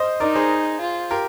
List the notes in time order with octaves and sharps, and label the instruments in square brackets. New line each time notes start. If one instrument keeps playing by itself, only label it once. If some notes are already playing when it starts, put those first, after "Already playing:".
Already playing: [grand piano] C5 D#5
[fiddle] D#4 [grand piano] A#4 D5
[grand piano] G#4 C5
[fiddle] F4
[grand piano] G4 A#4